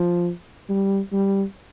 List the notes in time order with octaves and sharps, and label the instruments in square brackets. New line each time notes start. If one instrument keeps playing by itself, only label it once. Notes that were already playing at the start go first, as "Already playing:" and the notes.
Already playing: [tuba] F3
G3
G3